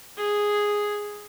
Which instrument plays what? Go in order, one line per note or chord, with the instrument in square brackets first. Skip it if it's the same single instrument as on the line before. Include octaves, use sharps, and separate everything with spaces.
[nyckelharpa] G#4